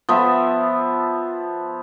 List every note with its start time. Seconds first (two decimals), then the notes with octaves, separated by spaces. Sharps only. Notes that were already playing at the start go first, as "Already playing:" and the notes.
0.09 F3 B3 E5